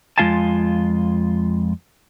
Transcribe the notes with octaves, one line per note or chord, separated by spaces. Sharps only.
F2 G#3 F4 F5 G#5 A5